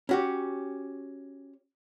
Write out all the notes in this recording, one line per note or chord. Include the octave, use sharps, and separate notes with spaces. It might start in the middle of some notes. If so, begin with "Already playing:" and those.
C#4 F#4 G4